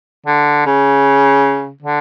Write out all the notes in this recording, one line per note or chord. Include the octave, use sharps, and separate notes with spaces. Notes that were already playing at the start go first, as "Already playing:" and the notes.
D3
C#3
D3